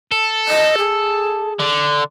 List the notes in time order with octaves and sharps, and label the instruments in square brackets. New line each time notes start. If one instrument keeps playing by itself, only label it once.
[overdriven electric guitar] A4
[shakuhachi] D#5
G#4
[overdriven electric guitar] D3